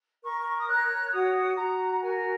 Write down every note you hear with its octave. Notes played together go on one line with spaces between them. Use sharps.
A#4 C#6
D#6
C#5 F#6
F#4 D#6
F#4 A#5
A#4 G#5